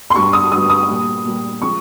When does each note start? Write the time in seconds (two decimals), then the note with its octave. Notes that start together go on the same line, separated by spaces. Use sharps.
0.10 C6
0.15 G2 G3 C#6
0.33 D#6
0.51 G2 G3 D#6
0.70 D#6
0.89 A#2 G3
1.25 A#2 G3
1.62 F3 G#3 C#6